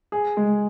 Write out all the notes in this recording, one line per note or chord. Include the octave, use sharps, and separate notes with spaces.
G#4
G#3